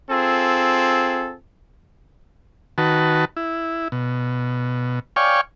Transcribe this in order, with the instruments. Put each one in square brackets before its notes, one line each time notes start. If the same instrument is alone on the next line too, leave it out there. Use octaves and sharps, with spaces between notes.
[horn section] C4 F4 G#4 A4
[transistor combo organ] D#3 F#4 B4 A5
E4
B2
C#5 D5 F5 G5 G#5 C#6